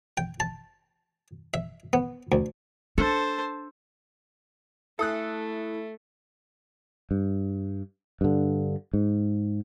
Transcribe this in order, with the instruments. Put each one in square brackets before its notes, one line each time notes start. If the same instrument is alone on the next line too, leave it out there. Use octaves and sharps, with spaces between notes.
[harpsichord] G5
A5
E5
B3
D2
[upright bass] D4 [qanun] A4 [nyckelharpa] C5 A5
[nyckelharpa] A3 [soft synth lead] E4 [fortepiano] A4 D#6 F#6 [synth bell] E5
[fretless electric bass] G2
G2 D3
G#2